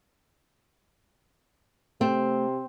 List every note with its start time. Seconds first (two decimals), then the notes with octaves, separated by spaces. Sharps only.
2.01 C3 A3 C4